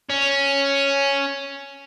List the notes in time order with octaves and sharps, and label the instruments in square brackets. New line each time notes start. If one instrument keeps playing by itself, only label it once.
[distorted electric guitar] C#4